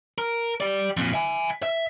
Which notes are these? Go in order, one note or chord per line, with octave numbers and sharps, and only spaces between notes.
A#4
G4 D5
F2 A#2
E5 G#5
E5